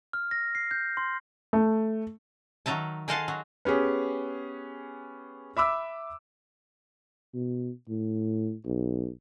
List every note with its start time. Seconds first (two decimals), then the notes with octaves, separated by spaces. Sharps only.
0.13 F6
0.31 A#6
0.55 C7
0.71 G6
0.97 C6
1.53 A3
2.66 D#3 F#3 D#4 E5 A5
3.08 G#4 C5 D#5 F5 F#5 A5
3.28 F#3
3.65 B3 C#4 G4 G#4 B4
5.57 E5 B5 D6 E6
7.34 B2
7.88 A2
8.66 B1